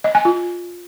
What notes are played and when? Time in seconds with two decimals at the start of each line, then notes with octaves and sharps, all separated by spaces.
0.04 D#5
0.15 G#5
0.25 F4